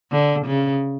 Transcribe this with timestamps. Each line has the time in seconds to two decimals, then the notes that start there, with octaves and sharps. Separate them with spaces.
0.12 D3
0.46 C#3